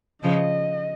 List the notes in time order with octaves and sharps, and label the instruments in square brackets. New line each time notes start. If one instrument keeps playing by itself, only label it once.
[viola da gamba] C#3 F3 [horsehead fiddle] D#5